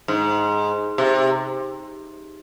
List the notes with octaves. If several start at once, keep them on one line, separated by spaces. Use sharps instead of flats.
G#2
C3